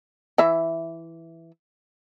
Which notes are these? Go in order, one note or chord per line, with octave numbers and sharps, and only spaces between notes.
E3 E5